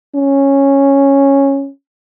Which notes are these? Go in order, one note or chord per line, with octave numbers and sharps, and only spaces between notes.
C#4